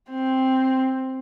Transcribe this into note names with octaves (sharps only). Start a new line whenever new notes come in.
C4